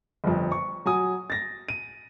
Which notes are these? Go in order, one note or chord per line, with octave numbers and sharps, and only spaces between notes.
G1 F2
C#6
F#3 G#5 D#6
A6 A#6
D#7